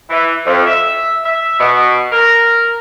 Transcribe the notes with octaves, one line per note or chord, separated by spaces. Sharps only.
E3
F2
E5
E5
B2
A#4